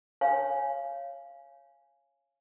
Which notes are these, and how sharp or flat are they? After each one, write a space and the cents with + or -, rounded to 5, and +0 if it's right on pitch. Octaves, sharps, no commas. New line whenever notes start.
C#5 -10 F5 -15 G#5 +5